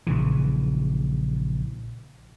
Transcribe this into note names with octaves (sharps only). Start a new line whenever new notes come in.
A#1 C#3 E3